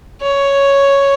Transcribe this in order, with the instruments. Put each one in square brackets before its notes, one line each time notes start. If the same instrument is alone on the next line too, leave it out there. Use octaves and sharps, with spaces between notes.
[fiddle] C#5